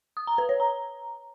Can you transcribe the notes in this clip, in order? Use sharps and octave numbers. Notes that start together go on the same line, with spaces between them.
D#6
A#5
B4
C#5
A#5